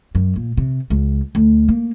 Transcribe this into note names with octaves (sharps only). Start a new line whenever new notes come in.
F#2
A#2
C3
C#2
D2
A#3